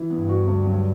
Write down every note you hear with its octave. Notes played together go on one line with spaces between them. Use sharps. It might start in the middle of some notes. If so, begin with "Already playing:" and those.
Already playing: E3
G2 B3
F#4
D2
F#3